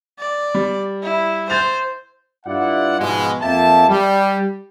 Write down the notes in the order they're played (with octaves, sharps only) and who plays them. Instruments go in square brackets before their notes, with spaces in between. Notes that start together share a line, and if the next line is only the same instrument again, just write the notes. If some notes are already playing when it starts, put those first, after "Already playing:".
[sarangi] D5
[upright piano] G3
[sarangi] E4
[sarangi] C5 [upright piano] G#6 A6 F7
[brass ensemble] G2 E4 F4 D5 F#5
G#2 B2 F3 G#3
F2 A#3 E5 G5 A5
G3